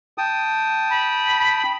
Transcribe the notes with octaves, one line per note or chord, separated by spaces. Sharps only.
G5 A5 D#6
B5